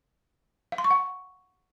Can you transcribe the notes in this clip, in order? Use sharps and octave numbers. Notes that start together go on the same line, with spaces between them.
F5
C6
C#6
F#5